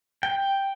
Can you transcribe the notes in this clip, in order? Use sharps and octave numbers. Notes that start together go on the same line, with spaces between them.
G5